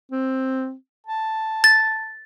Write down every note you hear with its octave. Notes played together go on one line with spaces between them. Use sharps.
C4
A5
A6